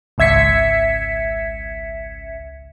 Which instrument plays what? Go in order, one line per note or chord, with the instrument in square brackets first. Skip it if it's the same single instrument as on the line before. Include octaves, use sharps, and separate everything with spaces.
[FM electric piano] G#1 C#2 E5 G#6 B6 C#7